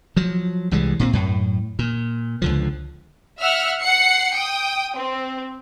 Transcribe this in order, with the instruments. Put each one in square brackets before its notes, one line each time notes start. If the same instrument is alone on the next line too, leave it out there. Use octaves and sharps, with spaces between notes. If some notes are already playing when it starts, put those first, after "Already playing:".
[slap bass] F3 F#3
C2 E3 G3 G#3
A#2 A#3 C4
F#2 A2
A#2
C#2 D3 F3
[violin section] E5 F#5 F6
F#5 C7 C#7
G5 D#6
C4